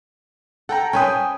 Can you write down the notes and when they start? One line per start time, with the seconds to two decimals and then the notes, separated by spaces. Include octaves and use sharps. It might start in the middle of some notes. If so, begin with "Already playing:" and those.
0.69 A4 F#5 G5 A#5
0.93 C#4 B4 C5 G5 G#5 D#6